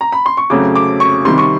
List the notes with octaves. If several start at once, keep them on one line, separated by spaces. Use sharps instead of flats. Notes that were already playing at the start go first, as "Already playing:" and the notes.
A#5
B5
C6
C#6
F2 C#3 F#3 A3 D6
D6
C#6
C3 D#3 G3 C6
C#6